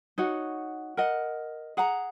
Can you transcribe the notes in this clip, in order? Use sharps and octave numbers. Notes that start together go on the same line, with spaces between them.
D#4 F#4 C#5 F#5
A#4 D#5 F#5
G#4 F#5 A#5